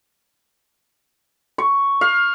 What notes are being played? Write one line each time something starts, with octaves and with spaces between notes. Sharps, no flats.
C#6
F5